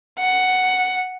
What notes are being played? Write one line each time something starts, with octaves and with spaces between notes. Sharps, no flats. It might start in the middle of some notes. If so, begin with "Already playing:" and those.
F#5